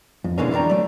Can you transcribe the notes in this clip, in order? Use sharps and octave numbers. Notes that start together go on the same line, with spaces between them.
F2
B2 D3 E3 G#3 A#3 C#4
C#2 E3 D4 G5 A#5
F#3 A3